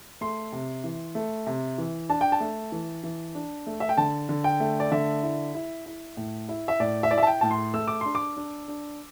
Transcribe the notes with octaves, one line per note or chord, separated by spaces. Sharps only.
A3 C6
C3
E3
A3
C3
E3
D4 A5
G5
A5
A3
E3
E3
D4
A3
E5
G5
D3 A5
D3
G5
A3
D5
D3 E5
E4
E4
E4
A2
E4
E5
A2 D5
E5
E4 D5
E5
A5
G5
A2 A5
C6
A3 E6
D6
D4 C6
D6
D4
D4